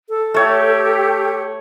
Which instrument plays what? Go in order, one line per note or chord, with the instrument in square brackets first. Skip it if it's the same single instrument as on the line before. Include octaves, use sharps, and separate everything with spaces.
[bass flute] A4
[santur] A3 C#5 [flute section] G4